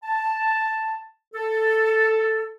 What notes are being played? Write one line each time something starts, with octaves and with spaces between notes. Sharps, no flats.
A5
A4